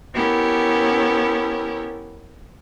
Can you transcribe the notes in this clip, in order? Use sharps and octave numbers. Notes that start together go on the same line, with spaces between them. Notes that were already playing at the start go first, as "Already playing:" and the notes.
B3 C#4 E4 G4 A#4